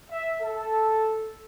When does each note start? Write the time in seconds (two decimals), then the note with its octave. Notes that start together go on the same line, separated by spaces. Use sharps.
0.11 E5
0.42 A4